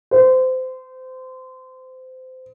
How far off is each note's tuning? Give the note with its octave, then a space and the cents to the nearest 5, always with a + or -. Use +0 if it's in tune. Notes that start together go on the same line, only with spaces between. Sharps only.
C5 -25